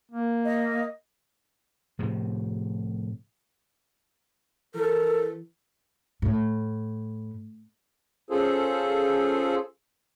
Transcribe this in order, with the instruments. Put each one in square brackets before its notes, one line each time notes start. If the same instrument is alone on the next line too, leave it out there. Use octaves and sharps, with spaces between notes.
[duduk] A#3
[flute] D#5
[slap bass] A2 C3 F3
[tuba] E3 [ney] A4 [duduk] A#4
[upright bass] A2
[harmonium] C#4 F4 G#4 A4 C5